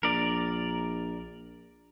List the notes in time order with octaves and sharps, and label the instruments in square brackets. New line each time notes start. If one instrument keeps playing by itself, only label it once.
[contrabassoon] A#1 [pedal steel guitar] A#4 D5